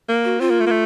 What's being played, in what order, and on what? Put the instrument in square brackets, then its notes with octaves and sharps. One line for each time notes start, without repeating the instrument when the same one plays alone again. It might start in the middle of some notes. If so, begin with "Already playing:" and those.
[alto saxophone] A#3
[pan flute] F#4
[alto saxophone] C4 [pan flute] F4
[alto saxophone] A#3
A3
A#3
A3